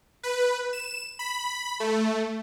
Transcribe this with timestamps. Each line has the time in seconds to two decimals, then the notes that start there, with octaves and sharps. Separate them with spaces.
0.23 B4
0.73 E7
1.19 B5
1.80 A3